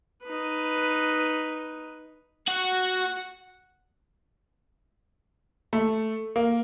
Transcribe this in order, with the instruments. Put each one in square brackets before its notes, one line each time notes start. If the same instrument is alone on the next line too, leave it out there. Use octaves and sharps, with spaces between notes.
[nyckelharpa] D#4 B4
[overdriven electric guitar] F#4 [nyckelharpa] F#5
[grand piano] A3
A#3